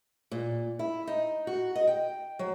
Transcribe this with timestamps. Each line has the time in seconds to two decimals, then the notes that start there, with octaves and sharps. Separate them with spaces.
0.31 A#2
0.79 E4
1.07 D#4
1.47 F#4
1.75 D#5
1.87 G5
2.39 F#3